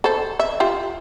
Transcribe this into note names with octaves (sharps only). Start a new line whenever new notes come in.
A4 C5
E5
F4 G4 E5